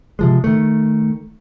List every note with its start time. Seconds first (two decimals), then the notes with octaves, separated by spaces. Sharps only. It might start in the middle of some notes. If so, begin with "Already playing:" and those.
0.19 C3 F3 G#3
0.44 D#3 A3